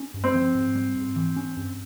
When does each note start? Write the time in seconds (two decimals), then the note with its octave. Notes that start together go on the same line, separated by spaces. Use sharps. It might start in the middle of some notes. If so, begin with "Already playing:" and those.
Already playing: C#4
0.14 G2
0.24 C4
0.34 F3
0.55 G#2
0.75 G3
0.96 G#2
1.16 E3
1.36 C#4
1.57 G2